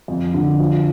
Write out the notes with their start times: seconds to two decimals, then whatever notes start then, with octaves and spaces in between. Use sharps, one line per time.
0.08 F2
0.34 D3
0.59 F3